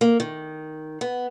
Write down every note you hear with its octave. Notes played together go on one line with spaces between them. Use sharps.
A#3
D#3
B3